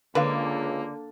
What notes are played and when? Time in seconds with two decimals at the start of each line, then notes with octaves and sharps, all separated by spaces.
0.15 C#2 D3 A#3 B4 F5